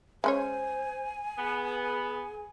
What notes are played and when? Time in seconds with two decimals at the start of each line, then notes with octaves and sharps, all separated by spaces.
0.24 G#3 C#4 C5 C#5 G#5
1.38 B3 G#4